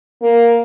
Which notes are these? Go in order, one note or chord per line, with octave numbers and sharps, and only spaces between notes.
A#3